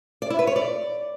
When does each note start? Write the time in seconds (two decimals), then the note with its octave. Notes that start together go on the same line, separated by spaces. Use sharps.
0.22 D5
0.30 E4
0.39 B4
0.47 C#5
0.56 D5